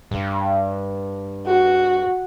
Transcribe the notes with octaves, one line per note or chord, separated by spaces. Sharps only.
G2
F#4